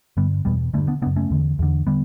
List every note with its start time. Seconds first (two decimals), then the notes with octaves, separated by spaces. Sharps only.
0.17 G2 D3 G3 B3
0.45 E2 B2 G3 B3
0.74 D3 A3 C#4
0.77 G2
0.88 B3 D4
1.02 C#3 B3 D4
1.06 F#2
1.16 A3 C#4
1.30 E2 D3
1.59 E2 D3
1.87 D3 G3 B3